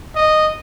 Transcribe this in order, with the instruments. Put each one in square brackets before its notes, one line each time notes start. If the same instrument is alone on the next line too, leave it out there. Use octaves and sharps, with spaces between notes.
[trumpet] D#5